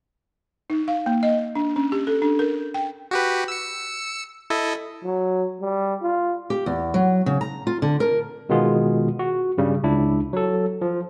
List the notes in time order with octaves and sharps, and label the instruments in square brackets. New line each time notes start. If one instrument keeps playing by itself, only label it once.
[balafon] D#4
F5
A#3
D#5
D4
C#4
G4
A4
D4
A#4
G5
[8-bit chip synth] F#4 G4 B4
E6 C#7
E4 A4 D#5
[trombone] F#3
G3
F4
[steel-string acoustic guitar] G4
E2
F#3
C#3
A#5
F4
D3
A#4
[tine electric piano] B2 D#3 G#3 B3 F4 G#4
F#4
G2 C#3 G3
C#2 D4 E4
F#3 A4
F3